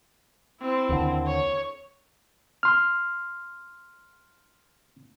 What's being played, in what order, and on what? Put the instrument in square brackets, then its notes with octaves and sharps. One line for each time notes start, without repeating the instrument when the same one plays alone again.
[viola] C4 E4
[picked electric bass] D#2 D3
[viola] C#5
[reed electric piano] C6 F6